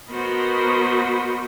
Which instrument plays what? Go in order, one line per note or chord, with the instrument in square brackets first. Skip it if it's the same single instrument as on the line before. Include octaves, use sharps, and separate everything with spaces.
[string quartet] B3 F#4 A#4 C5 D#5 B5